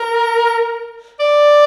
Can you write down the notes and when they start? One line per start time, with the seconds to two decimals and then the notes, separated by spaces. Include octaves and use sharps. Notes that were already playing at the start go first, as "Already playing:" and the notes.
Already playing: A#4
1.20 D5